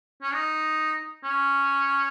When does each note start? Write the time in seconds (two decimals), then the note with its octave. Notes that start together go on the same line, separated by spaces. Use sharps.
0.22 C#4
0.33 D#4
1.24 C#4